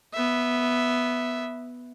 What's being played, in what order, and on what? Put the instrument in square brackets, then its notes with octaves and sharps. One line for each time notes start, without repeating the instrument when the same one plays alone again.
[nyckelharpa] B3 E5